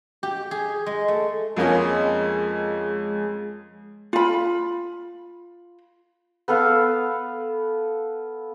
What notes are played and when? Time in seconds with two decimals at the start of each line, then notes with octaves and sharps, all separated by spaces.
0.23 G4
0.51 G#4
0.86 G#3
1.08 A3
1.56 F2 G#3 A#3 C#4
4.13 F4 B5
6.48 B3 A4 B4 F5